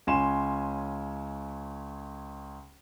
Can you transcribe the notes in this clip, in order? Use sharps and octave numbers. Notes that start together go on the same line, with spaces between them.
C#2 C#4 G#5 C6 E7